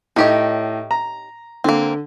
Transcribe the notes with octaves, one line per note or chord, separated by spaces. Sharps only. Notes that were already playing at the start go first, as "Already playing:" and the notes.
A2 D#4 G4 C#5 D#5
A#5
D3 A#3 C4